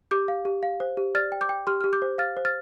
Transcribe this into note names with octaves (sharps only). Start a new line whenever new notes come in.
G4 D6 G6
F5
G4
F5
C5
G4
D5 F6 A6
G5
D6 G6
G5
G4 C6 F6
G4 F6
D6 G6
C5
F5 F6 A6
C5
F6 A6